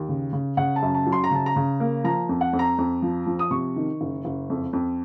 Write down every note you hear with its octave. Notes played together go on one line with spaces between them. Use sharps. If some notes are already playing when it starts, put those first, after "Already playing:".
Already playing: D#2
C#3
C#3
C#3 F#5
A5
F#2
A5
F#3
C6
A#5
C#3 A5
A#5
C#3
A#3
F3 A#5
F2
F#5
F2
A#5
F2
F3
F3
D#6
C3 C#6
D#3
F#1
F#1
F2
F2